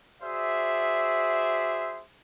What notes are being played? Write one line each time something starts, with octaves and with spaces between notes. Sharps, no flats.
F#4 G#4 C5 D5 E5